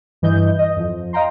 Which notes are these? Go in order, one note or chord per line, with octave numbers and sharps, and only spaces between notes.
G2 E3 D#5 G6
D#5
F2 F3
D#5 F5 G5 A#5 C6